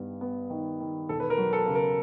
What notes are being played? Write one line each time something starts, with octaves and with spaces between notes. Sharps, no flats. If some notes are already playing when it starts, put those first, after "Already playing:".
Already playing: G2 D#3 B3
B3
D#3
D#3
E1 A4
B4
A#4
F#3
A4
C#3
A#4